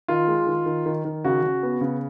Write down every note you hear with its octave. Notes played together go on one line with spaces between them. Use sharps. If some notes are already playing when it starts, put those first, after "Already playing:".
D#3 F4
G#3
D#3
D#3
D#3
D#3
C#3 F#4
C#3
B3
C#3